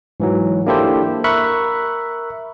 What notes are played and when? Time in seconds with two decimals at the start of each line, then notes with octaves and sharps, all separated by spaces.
0.20 G#2 E3 F#3
0.66 A#3 D4 E4 G4 A4 C5
1.24 A#4 E5 B5 C#6 F#6